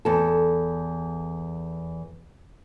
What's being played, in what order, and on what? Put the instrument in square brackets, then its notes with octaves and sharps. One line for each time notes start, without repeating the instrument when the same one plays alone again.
[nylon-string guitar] E2 A4